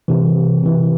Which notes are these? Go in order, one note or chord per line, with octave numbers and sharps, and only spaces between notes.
C3 E3
C3 E3